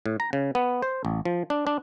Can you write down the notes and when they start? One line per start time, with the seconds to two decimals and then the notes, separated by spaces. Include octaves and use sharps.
0.06 A2
0.20 A#5
0.33 C#3
0.55 B3
0.82 C5
1.05 A1
1.25 F3
1.50 D4
1.67 D4